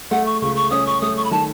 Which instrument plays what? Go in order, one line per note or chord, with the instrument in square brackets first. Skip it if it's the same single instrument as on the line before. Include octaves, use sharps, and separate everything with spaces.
[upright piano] A3 [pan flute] F#5
[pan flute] C#6
[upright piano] C#2 [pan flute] C#6
[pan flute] C#6
[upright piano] C#4 [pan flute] D#6
[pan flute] C#6
[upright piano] A3 [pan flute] D#6
[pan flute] C#6
B5
[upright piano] D#3 [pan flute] A5